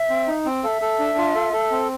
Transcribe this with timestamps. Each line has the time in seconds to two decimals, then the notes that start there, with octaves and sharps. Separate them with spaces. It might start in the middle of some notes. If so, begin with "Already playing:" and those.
Already playing: E5
0.10 C4
0.28 D#4
0.46 C4
0.64 A4 E5 F5
0.82 A4
0.99 D4
1.18 F4
1.35 A4
1.53 A4
1.71 C4